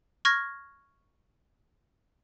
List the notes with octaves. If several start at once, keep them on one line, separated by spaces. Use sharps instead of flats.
C#6 F6 G#6 A#6